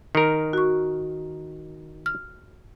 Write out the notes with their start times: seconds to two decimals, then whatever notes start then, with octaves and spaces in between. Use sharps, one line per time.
0.15 D#3 A#4
0.53 F#4 C#6
2.06 F6